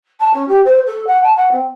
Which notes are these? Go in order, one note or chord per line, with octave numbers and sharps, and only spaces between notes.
A5
C#4
G4
C5
A4
F#5
A5
F#5
C4